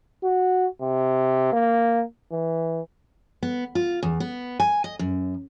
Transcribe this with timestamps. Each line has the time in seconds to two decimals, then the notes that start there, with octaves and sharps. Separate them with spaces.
0.23 F#4
0.81 C3
1.52 A#3
2.32 E3
3.43 B3
3.75 F4
4.03 E2
4.20 B3
4.60 G#5
4.84 D#5
4.99 F#2